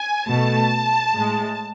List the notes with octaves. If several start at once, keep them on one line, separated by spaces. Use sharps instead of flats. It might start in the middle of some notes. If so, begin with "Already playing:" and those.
Already playing: G#5
B2 A3 A5
A2 G#3